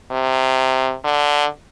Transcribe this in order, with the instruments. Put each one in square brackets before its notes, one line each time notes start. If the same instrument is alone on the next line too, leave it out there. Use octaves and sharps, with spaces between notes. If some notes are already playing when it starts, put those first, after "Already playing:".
[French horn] C3
D3